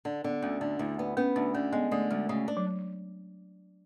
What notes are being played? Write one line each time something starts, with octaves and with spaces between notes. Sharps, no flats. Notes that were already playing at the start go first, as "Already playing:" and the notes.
D3 D4
D3 B3
D2 C#4
D3 D4
D2 E4
B3 D4
B3 C#4
D2 D4
D3 C#4
G#3 B3
D3 A3
D2 G#3
C#3 A3
D4
F#3